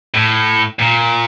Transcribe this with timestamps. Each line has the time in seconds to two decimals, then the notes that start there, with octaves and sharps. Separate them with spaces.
0.14 A2
0.79 A#2